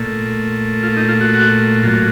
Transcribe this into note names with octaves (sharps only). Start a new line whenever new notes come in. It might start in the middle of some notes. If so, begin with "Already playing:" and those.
Already playing: A#2 A3
F4
D#4
F4
F#4
F#4
A2 F#3 A#3 F4